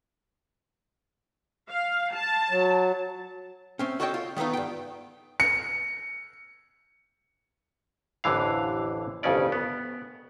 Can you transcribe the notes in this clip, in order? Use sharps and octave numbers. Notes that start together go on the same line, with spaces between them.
F5
A5
F#3
A3 C4 C#4
F#4 A4 C#5 D#5 F#5 G5
F4
D#3 A3 B3 D#4 F4
G2 G5
C#7
A1 F2 D3 E3 F5
G1 C2 F2 C#3 C#4 D5
B3